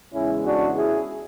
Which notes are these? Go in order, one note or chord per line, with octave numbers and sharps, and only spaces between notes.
E2 C#3 G#3 C#4 E4
D4 F#4
E4 G#4